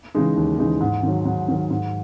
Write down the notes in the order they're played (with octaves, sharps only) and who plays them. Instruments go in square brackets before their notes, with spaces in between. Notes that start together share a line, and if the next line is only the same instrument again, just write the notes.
[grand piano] C#3 E3 G#3 D#4
D#2
C#3 E3 G#3 D#4
G#2
D#3 F#3
G#2
D#3 F#3
G#2